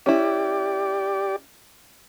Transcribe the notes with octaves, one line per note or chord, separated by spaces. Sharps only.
C#4 E4 G4 D5